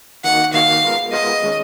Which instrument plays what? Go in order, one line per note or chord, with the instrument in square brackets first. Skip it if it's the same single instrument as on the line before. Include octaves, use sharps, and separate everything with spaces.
[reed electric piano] D#3 A#3 D#4 F#4 [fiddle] F#5
[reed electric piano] D#3 A#3 D#4 F#4 [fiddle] F5
[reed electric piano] G#3 B3 F4 A#4
[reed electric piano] G#3 B3 F4 A#4 [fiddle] D#5
[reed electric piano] D#3 G#3 C#4